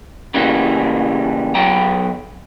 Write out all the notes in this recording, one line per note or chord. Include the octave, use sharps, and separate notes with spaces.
C#3 E3 G3 A#3
B1 B2 F#3 G5 A#5